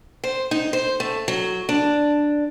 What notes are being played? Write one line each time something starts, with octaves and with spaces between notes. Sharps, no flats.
C5
D#4
C5
A3
F#3
D4